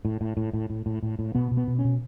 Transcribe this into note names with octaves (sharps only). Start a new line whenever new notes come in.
A2
A2
A2
A2
A2
A2
A2
A2
B2 B3
B2
B3
B2
C#4
B2